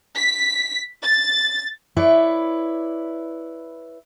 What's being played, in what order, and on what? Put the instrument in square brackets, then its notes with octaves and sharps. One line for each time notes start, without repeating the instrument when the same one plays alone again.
[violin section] B6
A6
[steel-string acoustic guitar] E4 B4 C#5 D5